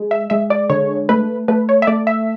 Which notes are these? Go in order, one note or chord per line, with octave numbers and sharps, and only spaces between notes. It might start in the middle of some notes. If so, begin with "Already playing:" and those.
Already playing: G#3
E5
G#3 E5
D5
D3 C#5
A3 B4
A3 B4
C#5
E5
A3 D5
E5